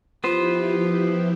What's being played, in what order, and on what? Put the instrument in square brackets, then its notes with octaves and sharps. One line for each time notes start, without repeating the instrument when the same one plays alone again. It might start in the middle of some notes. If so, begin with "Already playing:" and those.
[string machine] F3 E4 G4 [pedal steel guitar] B3 B4 C5 [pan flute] F4